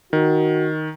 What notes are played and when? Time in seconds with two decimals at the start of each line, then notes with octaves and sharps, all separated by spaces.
0.13 D#3 F#4